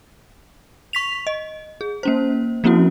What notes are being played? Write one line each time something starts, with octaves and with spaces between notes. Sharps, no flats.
C#6 B6 F7
D#5
G#4
A#3 C#4 C5
F3 A#3 C4 C#4 E4 F#4